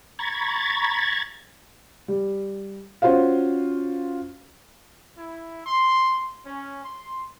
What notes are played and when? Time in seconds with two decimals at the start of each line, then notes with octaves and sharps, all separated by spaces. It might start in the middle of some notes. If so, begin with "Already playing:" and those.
0.19 A#5 B5 C#6 G#6 A6
2.08 G3
3.02 C#4 F4 F#4 C5 F5
5.17 E4
5.66 C6
6.45 C#4
6.84 C6